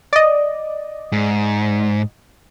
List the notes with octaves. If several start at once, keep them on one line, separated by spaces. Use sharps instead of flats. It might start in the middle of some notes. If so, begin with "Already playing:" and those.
D5 D#5
G#2